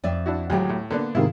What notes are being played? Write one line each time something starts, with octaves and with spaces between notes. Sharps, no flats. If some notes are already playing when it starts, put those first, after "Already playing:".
F2 D5 E5
D4 E4 F#4
D2 A2 F#3 G#3 F4 G4
A2
D3 A#3 B3 D4
G#2 C3 D#3 E4 F4 G#4